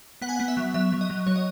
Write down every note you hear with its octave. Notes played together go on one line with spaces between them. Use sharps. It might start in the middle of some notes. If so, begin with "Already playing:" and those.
B3 F#5
G#5
B3 F#5
E5
F#3
F#3 E5
F#3
D#5
F#3
F#3 C#5
D#5